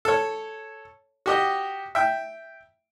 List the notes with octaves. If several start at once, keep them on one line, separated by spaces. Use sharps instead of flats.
A4 C#5
F#4 G4 D#5
E5 G5